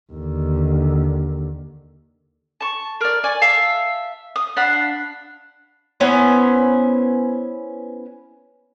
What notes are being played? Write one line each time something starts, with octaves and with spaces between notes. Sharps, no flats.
D#2 D3
A5 C#6
A#4 D5
D5 G#5 C#6
E5 F5 A5
D#6
D4 F5 F#5 B5
B3 C#4 E4 C5